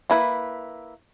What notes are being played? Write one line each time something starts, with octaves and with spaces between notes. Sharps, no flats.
A#3 E4 B4